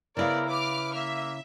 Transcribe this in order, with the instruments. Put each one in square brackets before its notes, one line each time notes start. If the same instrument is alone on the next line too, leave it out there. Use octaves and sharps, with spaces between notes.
[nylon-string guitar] C#3 E4 F5 [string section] B3 D5 [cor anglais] A#4
[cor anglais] B4 [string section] D6 F6
[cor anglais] A#3 [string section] E5